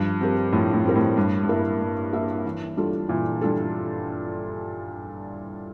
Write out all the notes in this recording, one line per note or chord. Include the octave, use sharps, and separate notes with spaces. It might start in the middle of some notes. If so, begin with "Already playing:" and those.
Already playing: G2 F3
C4 G4 A#4
A2 F3
A2
C4 G4 A#4
A2
G2 G3
G2
A#3 E4 A#4 E5
G3
A#3 E4 A#4 E5
E3
G3 D4 F4 A4
A#2 E3
G3 D4 F4 A4